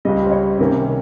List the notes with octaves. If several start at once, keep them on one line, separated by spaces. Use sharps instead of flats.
C#2 C#3 G3 D#5
C5
C#5
C3 D#3 A#3 C#4